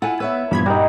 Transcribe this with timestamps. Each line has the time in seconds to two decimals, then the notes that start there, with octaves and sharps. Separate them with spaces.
0.02 E4 F4 A4 F#5 G#5
0.20 B3 B4 C#5 E5 E6
0.51 G2 A#2 E3 F3 B3 B5 G#6
0.66 G3 D#4 F#4 A#4 F#5